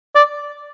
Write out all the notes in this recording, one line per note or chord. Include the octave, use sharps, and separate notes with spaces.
D5